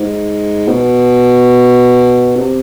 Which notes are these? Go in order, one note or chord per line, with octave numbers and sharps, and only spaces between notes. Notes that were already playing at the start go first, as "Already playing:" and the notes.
Already playing: G#2
B2
C3